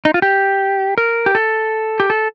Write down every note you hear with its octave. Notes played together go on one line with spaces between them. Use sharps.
D#4
F4
G4
A#4
G4
A4
G4
A4